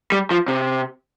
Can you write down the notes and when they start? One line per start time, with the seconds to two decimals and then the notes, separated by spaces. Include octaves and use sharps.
0.12 G3
0.31 F3
0.48 C3